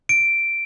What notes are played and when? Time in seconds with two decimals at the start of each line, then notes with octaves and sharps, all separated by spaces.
0.09 D7